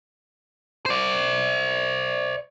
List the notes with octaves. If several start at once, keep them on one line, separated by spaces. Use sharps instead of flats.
C5 D5